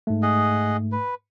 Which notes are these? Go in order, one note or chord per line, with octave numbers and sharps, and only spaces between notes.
G#2 A3
G#4 D#5 F#5
B4